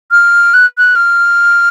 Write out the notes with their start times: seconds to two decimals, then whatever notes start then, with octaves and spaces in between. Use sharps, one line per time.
0.11 F6
0.54 F#6
0.78 F#6
0.95 F6